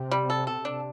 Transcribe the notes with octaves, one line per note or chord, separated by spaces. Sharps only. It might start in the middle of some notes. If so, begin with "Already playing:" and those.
Already playing: C3
G3
A4
A4
D4